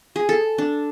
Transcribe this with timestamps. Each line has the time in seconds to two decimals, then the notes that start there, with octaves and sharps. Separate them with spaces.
0.16 G#4
0.29 A4
0.58 D4